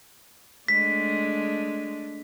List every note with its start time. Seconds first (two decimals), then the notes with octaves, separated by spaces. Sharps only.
0.68 G#3 A3 D4 B6